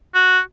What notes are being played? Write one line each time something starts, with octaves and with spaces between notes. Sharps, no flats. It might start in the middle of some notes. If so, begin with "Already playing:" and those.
F#4